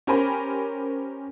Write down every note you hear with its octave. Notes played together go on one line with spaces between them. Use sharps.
C#4 G4 A#4 C5 G#5 B5